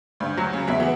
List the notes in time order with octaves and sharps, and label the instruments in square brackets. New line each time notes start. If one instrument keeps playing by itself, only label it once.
[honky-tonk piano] D2 [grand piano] G2
[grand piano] F#3
[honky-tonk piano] C#3
[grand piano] E2 [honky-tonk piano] F#3 E5
[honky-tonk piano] E3 B3